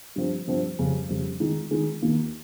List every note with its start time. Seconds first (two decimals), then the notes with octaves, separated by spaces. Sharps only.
0.16 G2 F3 C4
0.47 G2 F3 C4
0.79 F2 C#3 G3 C#4
1.09 F2 C#3 G3 C#4
1.40 D#3 G#3 D#4
1.71 D#3 G#3 D#4
2.02 D#2 D#3 A#3